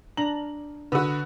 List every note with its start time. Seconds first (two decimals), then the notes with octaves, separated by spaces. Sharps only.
0.17 D4 A#5 F#7
0.92 D3 F#4 B4 D#6 E6